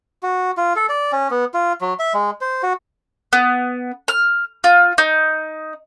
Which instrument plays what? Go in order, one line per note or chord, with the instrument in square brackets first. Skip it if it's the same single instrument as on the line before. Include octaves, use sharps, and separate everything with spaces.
[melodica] F#4
F4
A4
D5
C#4
B3
F4
F#3
E5
G#3
C5
F#4
[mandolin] B3
F6
F4
D#4